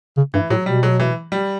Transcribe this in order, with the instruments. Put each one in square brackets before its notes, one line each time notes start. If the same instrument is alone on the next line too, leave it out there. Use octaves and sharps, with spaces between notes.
[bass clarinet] C#3
[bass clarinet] G2 [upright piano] E3
[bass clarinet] A2 [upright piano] F#3
[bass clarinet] B2 [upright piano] G3
[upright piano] F#3
E3
G3